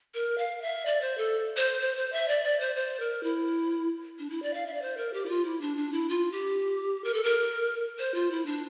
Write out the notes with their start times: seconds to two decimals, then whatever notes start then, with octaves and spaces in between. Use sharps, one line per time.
0.14 A#4
0.38 F5
0.62 E5
0.86 D5
1.01 C5
1.18 A4
1.57 C5
1.81 C5
1.97 C5
2.12 E5
2.28 D5
2.44 D5
2.60 C5
2.76 C5
3.00 A#4
3.23 E4
4.19 D4
4.30 E4
4.43 D5
4.54 F5
4.66 E5
4.74 D5
4.82 C5
4.97 A#4
5.14 G4
5.26 E4
5.29 F4
5.45 E4
5.61 D4
5.77 D4
5.92 E4
6.09 F4
6.32 G4
7.04 A#4
7.14 A4
7.24 A#4
7.99 C5
8.14 F4
8.31 E4
8.46 D4